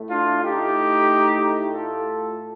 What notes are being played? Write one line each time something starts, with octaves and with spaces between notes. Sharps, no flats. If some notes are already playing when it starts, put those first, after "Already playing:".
Already playing: A2 A3
D4 F4
D#4 G4
F4 A4